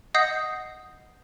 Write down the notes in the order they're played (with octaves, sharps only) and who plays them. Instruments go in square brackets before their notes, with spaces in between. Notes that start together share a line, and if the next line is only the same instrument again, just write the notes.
[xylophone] D#5 F#5 D#6 G6 A#6 C7